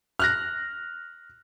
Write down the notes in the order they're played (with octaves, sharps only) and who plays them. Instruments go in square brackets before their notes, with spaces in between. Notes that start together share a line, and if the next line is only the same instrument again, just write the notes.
[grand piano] F6 F#6 A#6